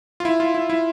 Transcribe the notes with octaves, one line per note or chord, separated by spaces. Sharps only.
F4
E4
F4
E4
E4